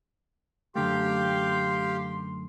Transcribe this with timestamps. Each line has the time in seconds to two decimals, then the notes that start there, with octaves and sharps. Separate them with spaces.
0.75 F#2 D3 A3 G4 F5 G5 C6